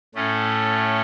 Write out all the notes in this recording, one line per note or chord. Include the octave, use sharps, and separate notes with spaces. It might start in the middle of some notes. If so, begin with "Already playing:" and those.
A2 A3 C#4